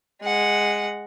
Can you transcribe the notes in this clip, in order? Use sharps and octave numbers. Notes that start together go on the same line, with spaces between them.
G#3 F#5